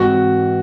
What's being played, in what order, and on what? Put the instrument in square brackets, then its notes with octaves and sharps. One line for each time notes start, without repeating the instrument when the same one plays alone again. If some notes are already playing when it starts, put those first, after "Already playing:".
Already playing: [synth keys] G#2 E3 G#3 C4 [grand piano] F#4